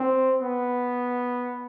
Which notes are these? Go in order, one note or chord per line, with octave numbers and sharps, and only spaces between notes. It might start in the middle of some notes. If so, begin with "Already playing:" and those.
Already playing: C4
B3